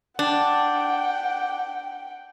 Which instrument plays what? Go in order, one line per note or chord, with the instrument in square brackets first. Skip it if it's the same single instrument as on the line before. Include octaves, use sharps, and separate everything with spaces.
[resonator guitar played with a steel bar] D4 [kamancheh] F#5 G5